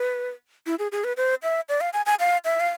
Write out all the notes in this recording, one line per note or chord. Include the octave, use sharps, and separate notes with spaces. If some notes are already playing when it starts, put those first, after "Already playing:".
Already playing: B4
E4
G#4
G#4
B4
C5
E5
D5
F5
G#5
G#5
F5
E5
F5